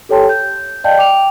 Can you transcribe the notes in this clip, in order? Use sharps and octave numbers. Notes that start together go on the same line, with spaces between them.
G4 A4 C#5 G5 A5 C6
G6
D5 D#5 F5 G5 A5 G6
G5 D6 F7